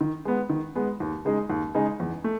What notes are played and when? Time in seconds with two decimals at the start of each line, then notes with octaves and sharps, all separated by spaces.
0.01 D#3
0.25 G#3 B3
0.49 D#3
0.75 G#3 B3
1.00 D#2
1.25 C#3 G#3 D#4 G#4
1.50 D#2
1.75 C#3 G#3 D#4 G#4
2.00 E2
2.24 A3